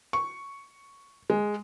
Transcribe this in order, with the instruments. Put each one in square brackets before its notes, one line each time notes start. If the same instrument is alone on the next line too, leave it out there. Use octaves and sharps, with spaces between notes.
[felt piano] C#6
G#3